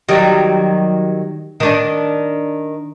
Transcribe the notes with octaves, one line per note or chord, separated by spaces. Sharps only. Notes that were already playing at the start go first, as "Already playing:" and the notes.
D#3 F#3 G3
D#3 D4